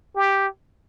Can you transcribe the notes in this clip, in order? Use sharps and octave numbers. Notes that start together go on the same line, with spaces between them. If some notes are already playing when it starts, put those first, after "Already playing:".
G4